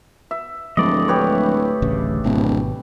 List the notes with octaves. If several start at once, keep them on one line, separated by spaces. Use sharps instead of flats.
E5
D1 G2 F3 G#3 A3 D5 D#5
G4 B4 C#5
D1 A1 C#3
D1 G#1 B2